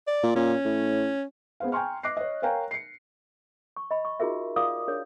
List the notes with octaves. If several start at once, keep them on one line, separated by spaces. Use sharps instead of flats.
D5
A#2
A#2 C#4
A2
B3 G#4 C5 F5
G5 G#5 A#5 C6 C#6 F6
D#5 D6 F#6 A#6 C7
C#5 D#5
A#4 C#5 F5 G5 G#5 A#5
C7 C#7
C#6
D#5 B5
C#6
D#4 F4 F#4 G#4 A#4 E5
F4 A#4 D5 F5 D6 D#6
D4 G#4 A#4 C#5